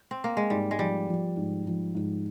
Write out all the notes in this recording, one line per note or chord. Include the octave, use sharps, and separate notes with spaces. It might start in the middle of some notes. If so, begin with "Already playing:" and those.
Already playing: D4
C4
A#3
G#3
G#2 G3
G#3
F3 G3
F3
G#2
F3
G#2